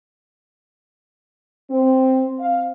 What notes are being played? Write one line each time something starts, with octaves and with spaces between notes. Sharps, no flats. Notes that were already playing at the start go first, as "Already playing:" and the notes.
C4
F5